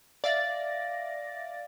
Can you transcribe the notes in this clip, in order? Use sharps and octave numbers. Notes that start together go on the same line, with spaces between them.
D5 E5 F5 A6 A#6